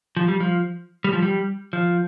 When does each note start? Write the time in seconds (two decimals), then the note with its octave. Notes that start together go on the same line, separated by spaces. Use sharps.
0.17 F3
0.28 G3
0.40 F3
1.04 G3
1.13 F3
1.22 G3
1.73 F3